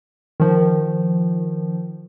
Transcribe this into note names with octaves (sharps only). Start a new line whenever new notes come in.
D#3 F3